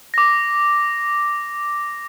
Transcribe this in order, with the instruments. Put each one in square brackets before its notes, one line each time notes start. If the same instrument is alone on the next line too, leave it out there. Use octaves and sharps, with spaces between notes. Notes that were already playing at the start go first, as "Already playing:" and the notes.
[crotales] D6 A#6